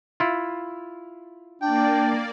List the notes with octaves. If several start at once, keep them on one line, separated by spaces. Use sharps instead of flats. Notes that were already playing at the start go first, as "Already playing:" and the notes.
E4 F4
A#3 D4 D5 G5